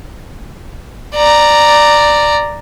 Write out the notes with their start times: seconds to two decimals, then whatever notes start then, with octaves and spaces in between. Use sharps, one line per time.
1.15 D5 A#5